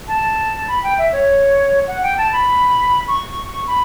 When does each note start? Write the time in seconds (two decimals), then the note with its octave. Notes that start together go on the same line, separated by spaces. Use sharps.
0.08 A5
0.68 B5
0.83 G5
0.98 E5
1.12 C#5
1.88 F#5
2.03 G5
2.18 A5
2.33 B5
3.08 C#6
3.67 B5